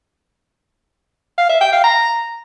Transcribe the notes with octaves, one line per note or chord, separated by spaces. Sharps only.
F5
E5
G5
F5
A#5